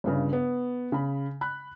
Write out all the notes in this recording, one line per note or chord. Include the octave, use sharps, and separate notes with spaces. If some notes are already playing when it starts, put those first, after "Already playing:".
G1 G2 C#3
B3
C#3 B5
B5 F#6